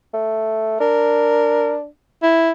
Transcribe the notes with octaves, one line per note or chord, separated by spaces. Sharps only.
A3
D4 A#4
E4